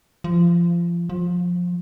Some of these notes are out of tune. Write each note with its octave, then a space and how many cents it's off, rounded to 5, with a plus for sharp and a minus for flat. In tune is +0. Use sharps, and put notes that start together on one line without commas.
F3 -25
F3 +20